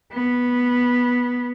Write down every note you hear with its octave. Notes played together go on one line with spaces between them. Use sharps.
B3